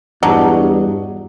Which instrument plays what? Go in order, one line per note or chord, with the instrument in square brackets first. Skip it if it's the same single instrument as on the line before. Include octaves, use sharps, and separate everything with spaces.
[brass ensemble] E2 G2 [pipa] F#3 D4 D#4